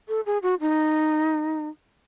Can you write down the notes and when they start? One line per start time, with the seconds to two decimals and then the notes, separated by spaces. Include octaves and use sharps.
0.09 A4
0.26 G#4
0.43 F#4
0.61 D#4